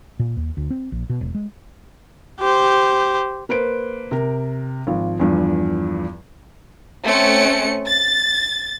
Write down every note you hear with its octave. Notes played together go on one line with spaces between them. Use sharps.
A#2
D#2
D2
C4
A#1
B2
E1
G#3
G4 C5
A#3 B4 C5 D7
C3 A#4
G#1 F3
E2 G2 F3
A3 C4 C#4 C#7
A6